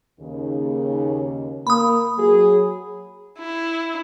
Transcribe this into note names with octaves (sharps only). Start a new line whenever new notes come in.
D#2 C#3
A#3 B5 D#6
F#3 G#4
E4